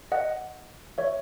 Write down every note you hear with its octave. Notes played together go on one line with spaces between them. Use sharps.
D#5 F#5
C#5 E5